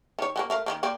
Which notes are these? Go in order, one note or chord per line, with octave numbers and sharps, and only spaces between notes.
D#3 C#5
F#3 G3 A#3
A3 A#4 F5
D#3 G#3 A#3
A#3 C4 D5